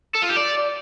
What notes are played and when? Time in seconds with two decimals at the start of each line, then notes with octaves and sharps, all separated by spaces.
0.15 A4
0.22 F4
0.30 G4
0.37 D5